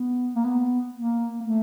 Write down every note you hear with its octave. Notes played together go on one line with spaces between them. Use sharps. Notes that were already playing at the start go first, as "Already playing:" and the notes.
Already playing: B3
A#3
B3
A#3
A#3
A3